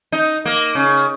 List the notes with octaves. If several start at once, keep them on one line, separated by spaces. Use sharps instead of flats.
D#4
A#3
C#3